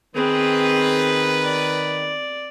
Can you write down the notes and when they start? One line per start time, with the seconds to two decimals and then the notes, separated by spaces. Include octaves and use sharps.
0.15 D#3 C4 G#4 B4
1.44 D5